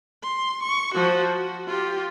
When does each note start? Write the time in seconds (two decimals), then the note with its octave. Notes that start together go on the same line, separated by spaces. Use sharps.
0.23 C6
0.63 C#6
0.95 F3 F#4
1.34 F#4
1.68 F4 G4